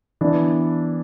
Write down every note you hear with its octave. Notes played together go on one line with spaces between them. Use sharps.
E3 B3 D4